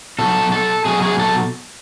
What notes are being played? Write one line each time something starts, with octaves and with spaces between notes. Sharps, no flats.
B2 F#3 A4
A4
B2 F#3 G#4
G#4
A4